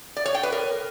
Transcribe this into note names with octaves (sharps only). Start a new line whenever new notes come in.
D5
C#5
G5
B4
A#4